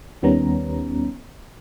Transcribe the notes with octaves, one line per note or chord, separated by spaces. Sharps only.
D#2 D#3 G3 B3 C#4 A#5